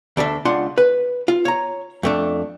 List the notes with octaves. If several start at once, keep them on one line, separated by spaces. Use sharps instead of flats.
D2 D4 A4 E5
C#2 D4 F4 F#5 C6
B4
F4
C#5 A#5
F2 A3 D4